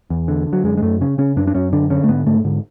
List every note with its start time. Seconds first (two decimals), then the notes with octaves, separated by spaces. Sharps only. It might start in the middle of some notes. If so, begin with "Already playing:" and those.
0.10 E2
0.28 D3
0.47 D3
0.53 F#3
0.64 F#2 G#3
0.77 G#3
0.82 F#2 A3
1.01 C#3 C#4
1.18 C#3 C#4
1.36 F#2 D4
1.47 D4
1.55 F#2 C#4
1.73 D3 D4
1.90 D3 C#4
2.04 A3
2.08 G#2 B3
2.26 G#2 A3
2.44 G#2 D3